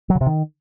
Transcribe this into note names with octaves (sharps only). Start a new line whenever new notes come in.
F#3
C#3
C3
D#3